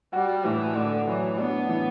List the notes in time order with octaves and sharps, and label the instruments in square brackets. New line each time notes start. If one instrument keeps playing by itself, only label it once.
[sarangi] G3 [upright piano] F#4
[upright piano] A2 [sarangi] E3
[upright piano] A2 [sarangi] D3
[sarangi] E3 [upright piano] F#3
[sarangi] B3 [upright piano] D4
[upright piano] E3